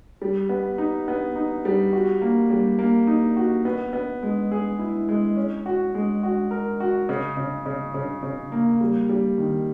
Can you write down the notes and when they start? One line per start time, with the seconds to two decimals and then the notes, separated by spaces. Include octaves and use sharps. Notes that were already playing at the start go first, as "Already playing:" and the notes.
0.22 G3
0.49 B3
0.78 D#4
1.08 B3
1.36 D#4
1.65 G3
1.93 F#4
2.22 A#3
2.50 G3
2.79 A#3
3.07 D#4
3.37 F#4
3.65 B3
3.93 B3
4.23 G#3
4.51 G#4
4.79 E4
5.09 G#3
5.37 C#4
5.66 F#4
5.95 G#3
6.23 F#4
6.51 A#4
6.80 F#4
7.09 C#3
7.37 C#3
7.66 C#3
7.94 C#3
8.23 C#3
8.52 A#3
8.81 G3
9.09 G3
9.38 D#3